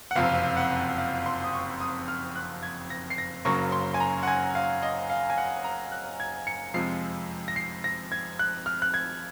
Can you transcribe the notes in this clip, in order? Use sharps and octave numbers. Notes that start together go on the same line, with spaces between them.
F#5
F#1 F2 C3 F5
F#5
F5
C6
D#6
C#6
D#6
F6
F#6
G#6
A#6
C7
A#6
F#1 F#2 C#3 F#3 A#3 C#6
C6
G#5
A#5
F#5
G#5
F5
D#5
F5
G#5
F#5
A#5
F#6
G#6
C#7
F2 C3 F3 G#3 C7
A#6
C7
A#6
G#6
F#6
F6
F#6
G#6